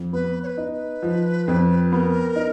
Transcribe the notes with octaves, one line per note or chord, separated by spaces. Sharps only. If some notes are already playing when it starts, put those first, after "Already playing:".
Already playing: F2
B3 B4
C#5
B4
D#4
B4
F3
F2
B3 A#4
D#4